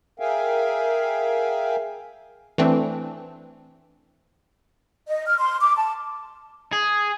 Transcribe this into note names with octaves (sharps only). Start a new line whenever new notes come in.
G#4 A#4 E5 F5 G5 G#5
E3 A3 C4 D4
D#5
F6
C6
D6
A5
G#4